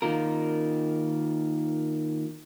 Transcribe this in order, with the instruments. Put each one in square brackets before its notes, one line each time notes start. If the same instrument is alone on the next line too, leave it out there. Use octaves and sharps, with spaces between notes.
[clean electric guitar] D#3 A#3 F4 A#4